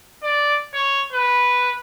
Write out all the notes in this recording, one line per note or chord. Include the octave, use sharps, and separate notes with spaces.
D5
C#5
B4